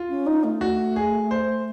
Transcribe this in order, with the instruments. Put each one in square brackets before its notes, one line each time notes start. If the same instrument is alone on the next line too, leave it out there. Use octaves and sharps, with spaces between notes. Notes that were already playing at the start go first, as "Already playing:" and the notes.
Already playing: [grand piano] F4
[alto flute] C#4
D#4
A3
[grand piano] F#4
G#4
C5